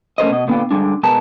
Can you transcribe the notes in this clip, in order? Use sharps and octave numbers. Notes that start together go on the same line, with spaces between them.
A3 C#4 A#4 C5 D#5
B2 D#5
A#2 D3 B3 F4 G5
D3 G3 G#3 D4
B2 G#3 B3 A#4 A5